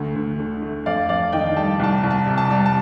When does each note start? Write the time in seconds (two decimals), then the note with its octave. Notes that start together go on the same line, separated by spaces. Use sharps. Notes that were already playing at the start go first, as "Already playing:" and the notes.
Already playing: D2 A3
0.16 D2
0.39 D3
0.62 A3
0.86 F2 D5 F5
1.09 F2 D5 F5
1.33 D#3 D#5 G5
1.56 G3 A5
1.79 C2 A5
2.03 C2
2.10 A5
2.27 C3
2.38 A5
2.50 G3
2.65 A5